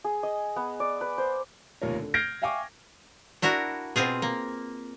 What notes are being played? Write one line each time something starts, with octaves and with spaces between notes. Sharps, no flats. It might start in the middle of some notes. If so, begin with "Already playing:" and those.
G#4
D#5
B3
D5
B4
C5
F1 D#2 F4 A#4 C#5
D3
F6 G6 G#6 A#6 C7 D7
E5 F5 G5 G#5 C#6 D6
D4 E4 F#4 A#4
B2 C4 F4 G#4
A#3